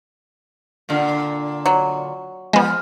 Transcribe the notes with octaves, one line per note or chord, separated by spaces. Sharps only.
A#2 D3
F#3
F3 G#3 B3